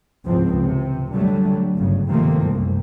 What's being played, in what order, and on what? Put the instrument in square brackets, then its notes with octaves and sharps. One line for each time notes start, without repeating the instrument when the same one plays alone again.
[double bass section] C#2 G#2 E3 F3 C4
C3
D3 F#3 G3 A3
G1 C#3
C3 D#3 F3 A3 A#3 C4
C2 F#2